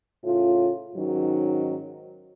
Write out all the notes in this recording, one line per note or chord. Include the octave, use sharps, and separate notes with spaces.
A2 C#3 F4
G#2 D#3 F#3 C#4